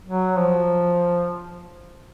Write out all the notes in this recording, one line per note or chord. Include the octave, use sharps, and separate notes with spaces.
F#3
F3